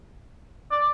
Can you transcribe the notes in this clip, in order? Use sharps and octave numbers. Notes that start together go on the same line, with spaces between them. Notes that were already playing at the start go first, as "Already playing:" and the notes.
D5